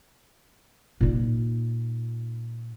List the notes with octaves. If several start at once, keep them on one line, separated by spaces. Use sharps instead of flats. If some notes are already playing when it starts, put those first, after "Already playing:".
A#2 D#4